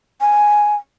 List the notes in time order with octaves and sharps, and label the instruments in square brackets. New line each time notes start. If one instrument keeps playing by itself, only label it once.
[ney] G#5